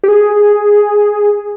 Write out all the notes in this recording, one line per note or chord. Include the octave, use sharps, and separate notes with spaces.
G4
G#4